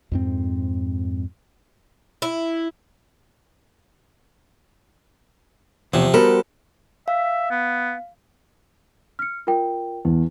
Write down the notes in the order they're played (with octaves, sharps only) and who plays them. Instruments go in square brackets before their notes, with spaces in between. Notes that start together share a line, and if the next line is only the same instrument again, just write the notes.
[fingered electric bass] F2 G#2 C4
[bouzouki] E4
[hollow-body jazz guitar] E2 [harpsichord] C3 F3
[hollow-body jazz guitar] G3 B3 [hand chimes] F#4 C5 [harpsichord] A4 [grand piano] A#4
[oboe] E5 [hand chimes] F5
[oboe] B3
[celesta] F6 C#7
F4 A#4 G5
[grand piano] E2 [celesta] E4